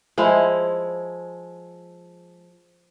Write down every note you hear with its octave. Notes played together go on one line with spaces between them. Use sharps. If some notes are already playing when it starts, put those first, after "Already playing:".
F3 G#3 E4